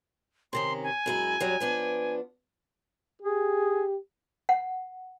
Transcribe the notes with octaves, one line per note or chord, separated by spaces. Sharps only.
C3 D#3 C#4 C6
G#5
F#2 G#3 E4
F#2 F#3 G3
F3 B3 D4
G4 G#4
F#5